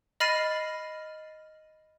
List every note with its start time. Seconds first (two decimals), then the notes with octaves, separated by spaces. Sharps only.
0.20 D#5 B5 F6 A6 C7 D#7